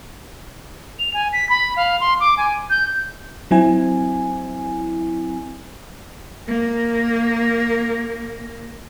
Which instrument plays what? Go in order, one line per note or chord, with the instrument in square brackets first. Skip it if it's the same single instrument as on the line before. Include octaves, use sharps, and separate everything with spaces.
[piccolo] F7
G#5
B6
B5
F5
C6
D6
G#5
G6
[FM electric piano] F#3 C4 E4 G#5
[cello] A#3 A#4